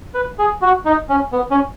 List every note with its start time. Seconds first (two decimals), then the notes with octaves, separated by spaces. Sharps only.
0.14 B4
0.39 G#4
0.62 F#4
0.85 D#4
1.09 C#4
1.32 B3
1.51 C#4